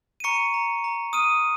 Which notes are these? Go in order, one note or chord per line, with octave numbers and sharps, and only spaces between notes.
D#7
A#5 C#6 C#7
A#5
A#5
D#6 F6 D#7